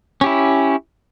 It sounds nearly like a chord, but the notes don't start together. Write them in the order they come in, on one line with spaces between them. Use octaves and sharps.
C#4 G4 E4